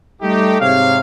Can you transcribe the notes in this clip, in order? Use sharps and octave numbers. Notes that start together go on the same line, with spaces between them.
G3 A3 D#4 G4
G#2 C3 C#5 F5